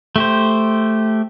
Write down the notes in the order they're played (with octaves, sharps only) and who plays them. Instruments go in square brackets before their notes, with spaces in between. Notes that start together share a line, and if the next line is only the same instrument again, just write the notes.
[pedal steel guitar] A3 G4 C5